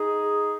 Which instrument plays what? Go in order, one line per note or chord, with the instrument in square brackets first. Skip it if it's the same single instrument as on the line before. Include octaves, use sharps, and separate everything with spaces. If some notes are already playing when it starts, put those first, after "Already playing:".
Already playing: [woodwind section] D#4 G#4